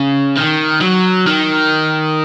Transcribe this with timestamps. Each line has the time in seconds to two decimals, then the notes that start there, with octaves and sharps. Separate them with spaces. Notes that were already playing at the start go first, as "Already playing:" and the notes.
Already playing: C#3
0.37 D#3
0.81 F#3
1.27 D#3